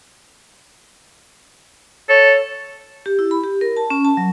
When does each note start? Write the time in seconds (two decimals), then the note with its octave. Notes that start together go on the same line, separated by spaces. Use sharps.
2.09 A4 C#5
3.06 G4
3.19 E4
3.31 B5
3.44 G4
3.61 A#4
3.77 A5
3.90 C#4
4.05 A5
4.17 F#3